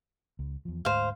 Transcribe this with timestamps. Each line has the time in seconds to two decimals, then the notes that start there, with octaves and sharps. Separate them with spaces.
0.39 C#2
0.65 E2 F3
0.85 D2 G#2 C5 F5